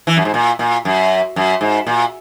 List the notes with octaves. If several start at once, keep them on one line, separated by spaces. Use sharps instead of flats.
E3
F#2
G#2
A#2
A#2
F#2
F#2
G#2
A#2